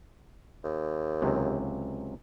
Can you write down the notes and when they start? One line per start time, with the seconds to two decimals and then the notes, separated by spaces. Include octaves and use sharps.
0.64 D#2
1.22 C#2 C3 F#3